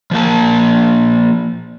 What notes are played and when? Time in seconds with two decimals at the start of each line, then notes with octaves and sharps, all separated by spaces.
0.11 F3 A#3 A5